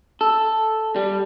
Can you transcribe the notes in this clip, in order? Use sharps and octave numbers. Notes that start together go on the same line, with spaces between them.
A4
G3